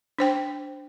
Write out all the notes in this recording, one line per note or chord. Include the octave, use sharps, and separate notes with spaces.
D4 C5 G5